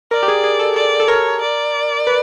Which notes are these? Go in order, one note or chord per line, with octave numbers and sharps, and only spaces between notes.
A#4 D5
G4
G#4
G#4
A4
A4 D5
A4
A#4 C#5
D5
B4